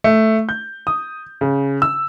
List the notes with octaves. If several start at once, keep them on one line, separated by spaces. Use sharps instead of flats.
A3
G6
D#6
C#3
E6